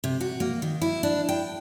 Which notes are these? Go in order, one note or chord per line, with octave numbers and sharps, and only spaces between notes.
C3
F#4
A#3
D#3
E4
D4
G5